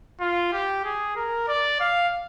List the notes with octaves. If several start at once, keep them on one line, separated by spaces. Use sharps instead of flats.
F4
G4
G#4
A#4
D5
F5